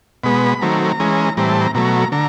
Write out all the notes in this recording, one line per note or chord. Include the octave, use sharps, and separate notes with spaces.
B2 G#3 B3 B5
D#3 F#3 A3 C4 A#5
E3 G#3 C#4
A2 E3 G3 C4 A#5
A5
A#5
B2 F#3 A3 A#5
D3 A#5